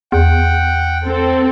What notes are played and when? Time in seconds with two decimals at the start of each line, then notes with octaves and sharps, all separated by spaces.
0.12 E2 F#5 G5
1.06 C4 A4